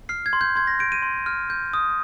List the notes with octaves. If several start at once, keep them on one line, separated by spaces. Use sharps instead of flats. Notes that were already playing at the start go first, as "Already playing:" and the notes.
F6 C7
G#6
C6
G6
C6 G#6
A#6
G6 D7
D#7
C6
F6
G6
D#6